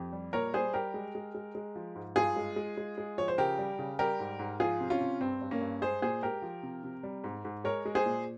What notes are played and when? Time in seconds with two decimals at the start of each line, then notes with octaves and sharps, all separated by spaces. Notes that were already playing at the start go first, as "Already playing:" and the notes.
Already playing: F2 G4
0.13 G3
0.33 A#2 A#4 C#5
0.53 G3 G#4 C5
0.74 G3 G4 A#4
0.94 G#3
1.15 G#3
1.35 G#3
1.55 G#3
1.76 F3
1.95 G#2
2.16 G2 F4 G#4
2.36 G#3
2.56 G#3
2.77 G#3
2.98 G#3
3.18 F3 C#5
3.28 C5
3.38 C#3 G4 A#4
3.59 G3
3.79 C#3
3.99 G3 G4 A#4
4.20 G#2
4.39 G#2
4.60 F3 F4 G#4
4.81 C3
4.90 C#4 F4
5.01 C3
5.21 G2 C4
5.41 G2
5.51 A#3 C#4
5.61 G2
5.82 G#3 G#4 C5
6.02 A#2 G#4 C5
6.23 G#3 G4 A#4
6.42 F3
6.63 C3
6.84 C3
7.03 G3
7.24 G#2
7.45 G#2
7.64 G#3 A#4 C#5
7.85 G#3
7.95 G#4 C5
8.06 A#2